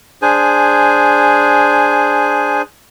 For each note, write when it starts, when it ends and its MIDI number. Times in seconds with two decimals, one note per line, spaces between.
0.22 2.62 62
0.22 2.62 68
0.22 2.62 72
0.22 2.62 80